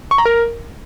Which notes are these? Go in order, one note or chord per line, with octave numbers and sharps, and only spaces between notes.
C#6
A#5
A#4